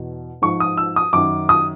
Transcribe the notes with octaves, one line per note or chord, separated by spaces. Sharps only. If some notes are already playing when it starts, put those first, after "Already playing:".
Already playing: E2 B2
G#2 F3 C#6
D#6
E6
D#6
F#2 D#3 D6
D#6